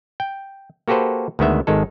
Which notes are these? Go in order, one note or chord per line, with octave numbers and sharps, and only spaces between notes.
G5
A#3 F#4 G4 A4 B4 C5
D2 D#3 G#3 B3 E5
G#1 D#3 G#3 A4